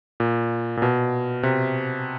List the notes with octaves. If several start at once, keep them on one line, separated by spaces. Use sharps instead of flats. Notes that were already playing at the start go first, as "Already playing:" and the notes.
A#2
A#2
B2
C3